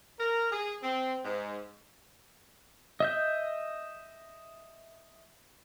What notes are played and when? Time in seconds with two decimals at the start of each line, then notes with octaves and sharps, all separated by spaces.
0.20 A#4
0.52 G#4
0.83 C4
1.24 G#2
3.00 D#5 E5 G6